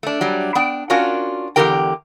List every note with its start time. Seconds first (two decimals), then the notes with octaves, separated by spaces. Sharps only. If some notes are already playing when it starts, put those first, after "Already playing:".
0.03 A3 D4
0.21 F#3 G3 D4
0.55 B3 D4 G5
0.90 C#4 D4 F4 F#4 A#4
1.56 E2 D3 F3 G4 A#4 G5